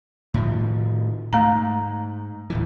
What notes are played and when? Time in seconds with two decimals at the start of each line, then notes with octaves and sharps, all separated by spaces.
0.34 A2 D#3 F3
1.33 G#2 A3 A#5
2.50 D1 A2 E3